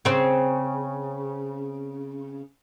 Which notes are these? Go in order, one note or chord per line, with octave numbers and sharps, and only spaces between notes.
C#3 C4